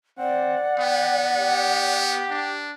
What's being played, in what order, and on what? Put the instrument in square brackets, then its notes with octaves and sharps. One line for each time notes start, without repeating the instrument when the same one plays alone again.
[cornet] C4 [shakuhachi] D5 [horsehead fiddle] F#5
[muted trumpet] B3 [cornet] G5
[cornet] G4
[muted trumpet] D4